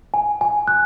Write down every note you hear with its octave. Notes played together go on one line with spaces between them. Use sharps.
G#5
G#5
F#6